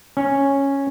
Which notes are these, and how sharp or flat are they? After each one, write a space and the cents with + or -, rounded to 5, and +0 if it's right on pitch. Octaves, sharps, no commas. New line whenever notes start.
C#4 -5